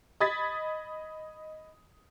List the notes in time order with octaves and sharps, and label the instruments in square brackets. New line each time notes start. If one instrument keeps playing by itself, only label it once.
[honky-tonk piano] D#5 B5 D#6 G#6 A6 B6